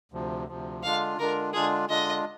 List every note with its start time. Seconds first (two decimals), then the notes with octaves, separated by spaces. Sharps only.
0.12 D2 C3 F3
0.48 D2 C3 F3
0.83 D3 G#3 D4 F4 F5
1.18 D3 G#3 D4 F4 A#4
1.53 D3 G#3 D4 F4 G#4
1.89 D3 G#3 D4 F4 D#5